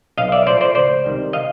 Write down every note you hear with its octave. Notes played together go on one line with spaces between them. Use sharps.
B1 D#5 F5
D5 E5
A2 F3 A3 C5 D5
C5 D5
C#2 C5 D5
C3 D#3 G3
D#5 F5